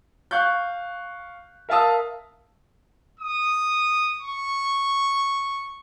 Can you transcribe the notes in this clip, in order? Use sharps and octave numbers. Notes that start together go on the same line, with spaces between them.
F5 C#6 F#6 G6
A#4 E5 F5 A5 D#6 E6
D#6
C#6